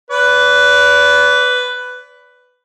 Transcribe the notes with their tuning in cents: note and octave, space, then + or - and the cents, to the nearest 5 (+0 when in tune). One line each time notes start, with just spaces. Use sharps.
B4 +10 D5 -35